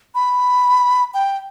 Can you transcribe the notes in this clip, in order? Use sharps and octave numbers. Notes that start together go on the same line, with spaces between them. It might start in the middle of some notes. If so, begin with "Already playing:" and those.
B5
G5